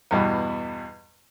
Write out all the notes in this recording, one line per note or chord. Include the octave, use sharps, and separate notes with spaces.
E2 G2 B2